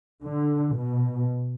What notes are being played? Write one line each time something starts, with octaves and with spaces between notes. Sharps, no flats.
D3
B2